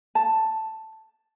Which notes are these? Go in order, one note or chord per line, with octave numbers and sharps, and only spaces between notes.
A5